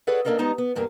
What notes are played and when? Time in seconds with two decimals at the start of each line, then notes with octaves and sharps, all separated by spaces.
0.07 G#4 A4 B4 C#5 D5 F#5
0.25 A#3 D4 A4 A#4 D5 D#5
0.38 G3 G#3 B3 D#4 A5 A#5
0.58 B3
0.75 E2 G2 A#3 G#4 A#4